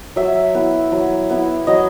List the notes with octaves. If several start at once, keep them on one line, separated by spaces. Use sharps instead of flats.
F#3 E5
B3 E4
F#3
B3 E4
F#3 D#5